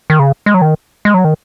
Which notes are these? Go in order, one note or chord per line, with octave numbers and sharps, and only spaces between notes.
D#3
C#3
G#3
F#3
D#3
G#3
F#3
D#3